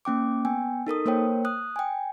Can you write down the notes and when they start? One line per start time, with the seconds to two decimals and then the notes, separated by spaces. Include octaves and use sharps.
0.05 A#3 C#4 G5 D6
0.45 B3 G5 G#5
0.87 D#4 A4 A#4 D#6
1.06 A#3 A#4 C5 C#5 G5
1.45 D#6 F#6
1.76 G5 G#5